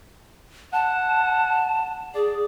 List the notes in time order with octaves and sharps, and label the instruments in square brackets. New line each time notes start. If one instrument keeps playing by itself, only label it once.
[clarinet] F#5 [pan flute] A5
[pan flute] G#4 [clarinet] D5